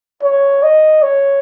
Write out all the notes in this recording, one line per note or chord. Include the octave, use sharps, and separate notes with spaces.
C#5
D#5
C#5